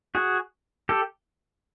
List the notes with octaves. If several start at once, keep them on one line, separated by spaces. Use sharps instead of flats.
F#4 G#4
G4 A4